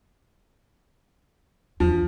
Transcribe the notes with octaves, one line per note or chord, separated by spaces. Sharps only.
E2 F3 D4